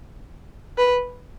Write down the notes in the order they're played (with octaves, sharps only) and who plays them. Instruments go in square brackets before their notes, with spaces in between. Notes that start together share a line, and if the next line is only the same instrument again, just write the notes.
[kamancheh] B4